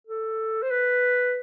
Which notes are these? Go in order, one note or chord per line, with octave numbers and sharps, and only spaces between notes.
A4
C5
B4